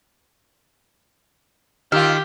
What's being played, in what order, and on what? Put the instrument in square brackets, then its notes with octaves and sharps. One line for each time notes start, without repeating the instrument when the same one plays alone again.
[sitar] D#3 F4 [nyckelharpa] G4 [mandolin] E6 F6